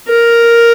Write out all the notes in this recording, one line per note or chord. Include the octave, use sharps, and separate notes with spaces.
A#4